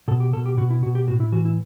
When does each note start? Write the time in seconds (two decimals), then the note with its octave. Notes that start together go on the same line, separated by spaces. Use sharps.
0.08 B2 A4
0.20 G4
0.33 B2 A4
0.46 G4
0.57 B2 F#4
0.70 E4
0.83 B2 F#4
0.95 G4
1.08 A2 F#4
1.20 E4
1.32 E3 F#4
1.45 E4